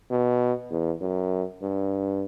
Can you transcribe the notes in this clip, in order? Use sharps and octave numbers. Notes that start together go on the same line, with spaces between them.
B2
E2
F#2
G2